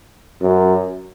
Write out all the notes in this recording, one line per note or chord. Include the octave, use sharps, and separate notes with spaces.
F#2